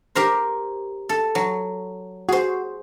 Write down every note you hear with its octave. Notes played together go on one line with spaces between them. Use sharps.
G4 A#4 C5
A4
F#3
F#4 G#4 C5